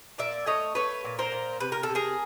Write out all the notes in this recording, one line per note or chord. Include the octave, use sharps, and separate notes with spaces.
A#2 D5 E5
A3 C#5 D#5
A3 B4 C#5
A#2
A#4 C5
A#2
C3 B4
A#4
A4
C3
G#4 A#4